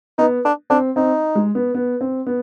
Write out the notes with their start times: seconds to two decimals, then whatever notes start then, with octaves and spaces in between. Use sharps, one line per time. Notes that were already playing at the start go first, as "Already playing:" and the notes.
0.18 B3 D#4
0.45 D4
0.70 C4 D4
0.96 C4 D#4
1.35 G#3
1.55 B3
1.75 B3
2.01 C4
2.27 B3